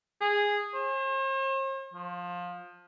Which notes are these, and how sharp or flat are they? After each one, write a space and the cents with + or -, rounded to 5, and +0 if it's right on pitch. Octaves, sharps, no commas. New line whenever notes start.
G#4 -10
C5 +45
F3 +20